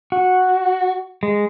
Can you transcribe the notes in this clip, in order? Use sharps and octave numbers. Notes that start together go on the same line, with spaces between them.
F#4
G#3